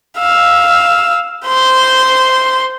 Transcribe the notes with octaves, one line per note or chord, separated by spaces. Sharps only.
F5 E6
C5 C6